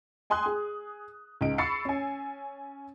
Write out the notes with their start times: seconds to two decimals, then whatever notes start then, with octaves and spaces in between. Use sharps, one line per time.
0.30 G5 G#5 C6 D#6 F#6
0.46 G#4
1.41 C#2 D#4 D7
1.58 B5 C#6 E6 A6 C7 C#7
1.85 C#4 G#5